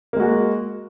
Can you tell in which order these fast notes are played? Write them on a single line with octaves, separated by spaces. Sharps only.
A#3 G#3 F#4